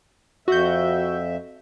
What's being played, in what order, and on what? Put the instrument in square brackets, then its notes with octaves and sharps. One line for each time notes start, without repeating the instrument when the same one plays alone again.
[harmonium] F2 E5 [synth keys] F#4 G6